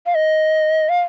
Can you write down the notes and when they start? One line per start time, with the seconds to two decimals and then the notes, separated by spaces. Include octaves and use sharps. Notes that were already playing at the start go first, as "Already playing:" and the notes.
0.06 F5
0.15 D#5
0.89 F5